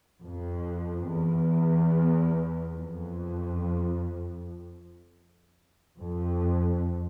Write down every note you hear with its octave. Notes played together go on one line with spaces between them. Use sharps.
F2
E2
F2
F2